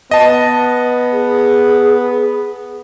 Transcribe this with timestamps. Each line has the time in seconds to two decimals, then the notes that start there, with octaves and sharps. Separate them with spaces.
0.11 B3 D#5 A5
1.12 G#4